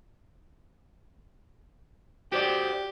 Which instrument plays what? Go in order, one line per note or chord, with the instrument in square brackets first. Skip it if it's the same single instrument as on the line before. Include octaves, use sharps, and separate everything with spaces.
[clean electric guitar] F#4 C5 D5 [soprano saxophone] G4